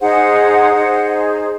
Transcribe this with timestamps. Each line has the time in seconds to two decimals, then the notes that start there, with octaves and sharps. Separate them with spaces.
0.01 D#4 G#4 C5 F#5
0.74 D#4 G#4 C5